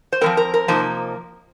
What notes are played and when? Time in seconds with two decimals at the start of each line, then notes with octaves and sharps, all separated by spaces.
0.12 C5
0.21 F3 G#3 C4 A#4
0.37 A#4
0.54 A#4
0.68 C3 F3 A#3 D#4 C5